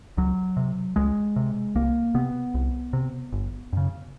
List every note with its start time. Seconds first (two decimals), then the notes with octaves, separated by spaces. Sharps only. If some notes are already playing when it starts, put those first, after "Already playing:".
0.17 C#2 F#3
0.57 C3
0.96 C#2 G#3
1.36 C3
1.75 C2 A#3
2.14 C3 B3
2.54 C2
2.93 C3
3.32 G1
3.73 F#2 C#3